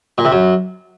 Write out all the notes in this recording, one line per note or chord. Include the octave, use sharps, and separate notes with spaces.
A#2
C3
F#2